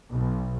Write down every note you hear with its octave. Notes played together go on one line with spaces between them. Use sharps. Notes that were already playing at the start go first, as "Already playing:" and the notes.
B1